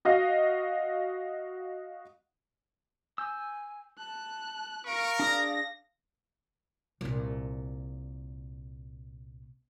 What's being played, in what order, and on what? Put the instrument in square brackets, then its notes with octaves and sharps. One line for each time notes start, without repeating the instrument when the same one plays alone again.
[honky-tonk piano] F#4 D#5 F5
[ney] G#5 [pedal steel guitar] E6 G6
[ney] A5 [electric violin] F#6
[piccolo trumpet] A#4 [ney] F5 [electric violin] C#6 D7
[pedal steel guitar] D4 G#4 D5 [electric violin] A#6
[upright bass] C2 A#2